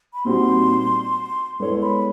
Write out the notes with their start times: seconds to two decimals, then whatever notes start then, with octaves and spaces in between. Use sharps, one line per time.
0.13 B5
0.25 A#2 G3 C4 D#4 F#4 C6
1.60 G#3 B3 E4 A4 C#5 C6
1.82 B5